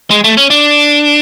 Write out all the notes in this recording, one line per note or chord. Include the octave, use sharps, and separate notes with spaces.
G#3
A3
C#4
D4